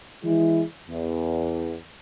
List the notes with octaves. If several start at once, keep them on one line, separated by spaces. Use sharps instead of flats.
E3 G#3 E4
E2